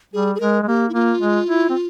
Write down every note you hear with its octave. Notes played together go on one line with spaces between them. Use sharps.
G3 G#4
G#4
G#3 A#4
G#3
A#3 G4
E4
A#3 F4
G#3
E4
C4